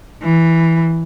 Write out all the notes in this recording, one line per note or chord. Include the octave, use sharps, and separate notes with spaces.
E3